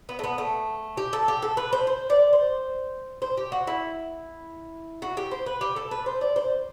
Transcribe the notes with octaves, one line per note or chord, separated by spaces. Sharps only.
B3
A3
B3
A3
G4
A4
G4
A4
B4
C5
C5
D5
C5
C5
G4
F#4
E4
F#4
G4
C5
B4
G4
A4
B4
C5
D5
C5